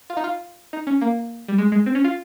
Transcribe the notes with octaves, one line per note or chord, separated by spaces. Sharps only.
F4
D#4
F4
D#4
C#4
A#3
G3
G#3
G#3
C4
C#4
F4